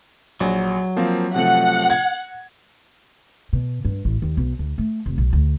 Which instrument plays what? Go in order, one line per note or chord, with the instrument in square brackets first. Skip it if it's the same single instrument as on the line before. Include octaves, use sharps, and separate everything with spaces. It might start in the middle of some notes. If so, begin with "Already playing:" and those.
[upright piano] A#1 [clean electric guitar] F#3
[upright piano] F3 A#3 C4
[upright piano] C3 F3 A3 [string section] F#5
[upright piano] G#6
[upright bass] B2
G2
A1
D#2
B1
D2
A3
F1
B1
D2